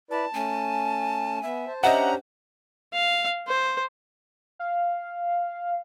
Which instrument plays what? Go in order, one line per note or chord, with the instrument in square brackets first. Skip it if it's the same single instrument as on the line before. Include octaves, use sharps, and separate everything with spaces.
[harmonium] E4 B4 D5 [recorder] A5
[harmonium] A3 C#4 [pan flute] G#5
[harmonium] B3 [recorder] E5
[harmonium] C5 A5
[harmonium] C#4 D4 G4 [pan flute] C5 [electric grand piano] D#5 E5 F#5 [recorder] A#5
[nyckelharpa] F5
C5
[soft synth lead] F5